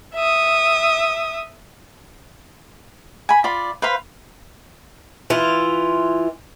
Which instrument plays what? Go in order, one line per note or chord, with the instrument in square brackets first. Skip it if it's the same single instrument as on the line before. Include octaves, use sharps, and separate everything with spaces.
[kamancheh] E5 D#6
[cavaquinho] G#5 B5
F4 D5 B5
B4 C5 F5 B5
[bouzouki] E3 F4